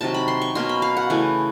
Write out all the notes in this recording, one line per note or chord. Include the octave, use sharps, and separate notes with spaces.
C3 D#3 F#3 A5
B5
C6
C#6
B2 F#3 A#3 C#4 C6
B5
F5
F#5
C#3 E3 A3